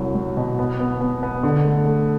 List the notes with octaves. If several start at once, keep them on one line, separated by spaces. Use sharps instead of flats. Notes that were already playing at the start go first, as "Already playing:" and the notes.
Already playing: C2 F#3
F#3
B2
B3
B3
B3
B3
D3
A3
A3